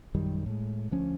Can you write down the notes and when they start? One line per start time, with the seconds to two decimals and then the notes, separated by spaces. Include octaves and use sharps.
0.14 A#1 F#2 D#3 G3
0.46 A2 G#3
0.91 D2 F3 C#4